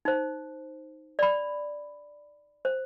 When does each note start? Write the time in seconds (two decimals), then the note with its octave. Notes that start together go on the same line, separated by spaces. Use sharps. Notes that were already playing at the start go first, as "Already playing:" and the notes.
0.05 D#4 C5
1.19 D5 B5
2.65 C5